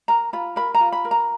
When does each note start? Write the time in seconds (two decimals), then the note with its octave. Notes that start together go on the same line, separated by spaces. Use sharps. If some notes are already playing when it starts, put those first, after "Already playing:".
0.08 A#4 A#5
0.33 F4 B5
0.56 A#4 B5
0.75 A#5
0.80 F4
0.92 B5
1.05 A#4
1.11 A#5